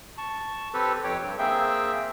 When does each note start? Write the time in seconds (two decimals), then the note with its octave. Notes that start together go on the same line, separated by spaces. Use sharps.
0.18 A5 C#6
0.74 C4 G4 A4 B4
1.04 F2 G4 C#5 G5
1.22 G2
1.39 A#3 C4 G#4 E5 G5